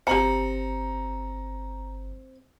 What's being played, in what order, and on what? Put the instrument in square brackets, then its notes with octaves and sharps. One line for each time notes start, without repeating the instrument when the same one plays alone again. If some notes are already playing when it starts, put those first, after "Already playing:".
[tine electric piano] G1 C#7 [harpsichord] C4 [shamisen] G4 A5 [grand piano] A#5 F#7